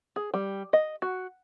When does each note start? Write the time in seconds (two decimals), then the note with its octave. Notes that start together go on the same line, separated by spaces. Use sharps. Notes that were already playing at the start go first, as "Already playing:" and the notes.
0.16 G#4
0.34 G3
0.73 D#5
1.02 F#4